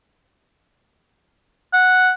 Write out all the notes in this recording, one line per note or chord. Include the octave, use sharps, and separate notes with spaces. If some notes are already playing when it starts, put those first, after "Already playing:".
F#5